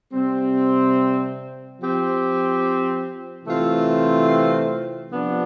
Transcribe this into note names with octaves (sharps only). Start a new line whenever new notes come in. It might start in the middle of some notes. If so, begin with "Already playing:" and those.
C3 G3 C4
F3 C4 G4
C3 E3 A3 C4 F4
C3 F3 B3 D4